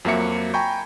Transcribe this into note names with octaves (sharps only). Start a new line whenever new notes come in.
F2 F#3 A#3 F#4 E5 C#7
G5 G#5 A#5 B5 C#6 G6